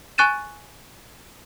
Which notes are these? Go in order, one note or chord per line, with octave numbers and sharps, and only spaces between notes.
G#5 C#6 F#6 A6 D#7 E7